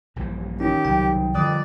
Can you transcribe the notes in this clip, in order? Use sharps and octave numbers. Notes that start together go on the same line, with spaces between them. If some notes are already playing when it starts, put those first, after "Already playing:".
A#1 G2 E3
D#3 C#4 G4
C2 C#3 F#3 G5
F2 D3 F3 G3 D5 D#6 F#6